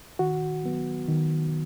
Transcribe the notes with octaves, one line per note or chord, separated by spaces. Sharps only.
D#3 F#4
F#3 B3
D#3